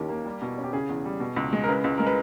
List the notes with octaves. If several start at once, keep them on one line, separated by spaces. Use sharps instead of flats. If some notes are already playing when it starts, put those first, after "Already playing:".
Already playing: D#2 D#3 C#4 G4
A#3
G3
B2
C#4
G4
C#3 G#4
E2
G3
B2
C#2
G#3
A#4
C#3 B4
C#2
G#3 A#4
B4